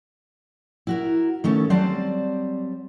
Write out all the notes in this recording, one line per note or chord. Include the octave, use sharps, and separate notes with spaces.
E4 F#4 A#4
D#3 A3 C#4 A4
F#3 G3 C4 C5 D5 A5